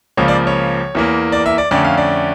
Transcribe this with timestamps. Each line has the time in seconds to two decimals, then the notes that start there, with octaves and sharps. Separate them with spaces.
0.17 C#2 C#3 F3 A#3 C#5
0.28 D5
0.47 C#5
0.95 E2 E3 A#3
1.32 D5
1.46 E5
1.58 D5
1.71 F2 D3 A3 C#4 D5
1.85 F5
1.97 D5